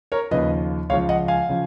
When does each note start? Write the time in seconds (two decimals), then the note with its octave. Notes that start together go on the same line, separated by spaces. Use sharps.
0.12 A#4 C#5
0.31 D#2 C#3 F3 B4 D#5
0.89 C#2 C#3 F3 C#5 F5
1.09 D#5 F#5
1.28 F5 G#5
1.49 C#3 F3